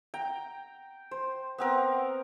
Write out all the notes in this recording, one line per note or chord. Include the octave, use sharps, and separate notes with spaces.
G5 A#5
C5
B3 C4 A#4